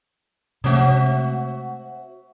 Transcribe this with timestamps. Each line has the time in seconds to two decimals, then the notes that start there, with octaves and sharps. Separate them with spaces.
0.64 C3 G#3 A3 C4 F#4 E5